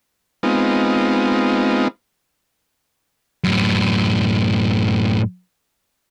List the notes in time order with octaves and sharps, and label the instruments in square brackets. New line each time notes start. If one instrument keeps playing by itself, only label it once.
[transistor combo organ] G#3 B3 C4 D#4 F4
[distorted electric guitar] F#2 A2